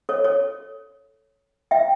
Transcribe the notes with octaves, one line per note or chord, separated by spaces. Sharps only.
A4 C#5
A4 C#5
E5 G5